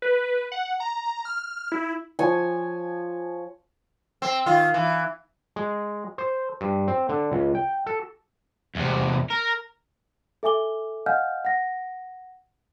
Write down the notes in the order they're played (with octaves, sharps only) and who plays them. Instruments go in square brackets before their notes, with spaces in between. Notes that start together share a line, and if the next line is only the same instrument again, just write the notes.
[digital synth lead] B4
F#5
A#5
F6
E4
[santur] F3 C#5 G#5
[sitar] C4
D#3 F4
E3
[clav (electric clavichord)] G#3
C5
G2
C4
D3
C#2
G5
A4
[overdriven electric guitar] E2 C3
A#4
[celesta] A4 E5 G#5 D6 G7
D#5 F5 F#5 G#5 F6 G6
F#5 A#6